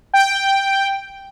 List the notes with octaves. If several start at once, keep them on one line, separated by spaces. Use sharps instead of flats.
G5